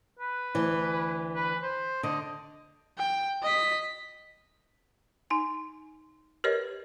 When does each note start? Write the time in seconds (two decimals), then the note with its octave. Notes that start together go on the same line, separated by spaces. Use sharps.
0.19 B4
0.55 D2 E3
1.35 B4
1.62 C5
2.03 D3 D#5
2.98 G5
3.43 D#5 B6
5.30 D#4 G#5
6.44 G4 A#4 B4 C#5 D#5